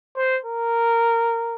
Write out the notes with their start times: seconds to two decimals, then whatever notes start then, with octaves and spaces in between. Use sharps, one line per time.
0.17 C5
0.45 A#4